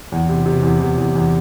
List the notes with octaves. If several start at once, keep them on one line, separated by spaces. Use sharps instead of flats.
E2
C3
C3
E2
E2
E2
E2